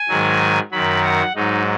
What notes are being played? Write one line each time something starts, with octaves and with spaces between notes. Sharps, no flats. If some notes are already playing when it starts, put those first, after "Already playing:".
Already playing: G#5
G#2 D#3 F#3
F#2 D#3 F#3 B5
F#5
G#2 F#3 D#4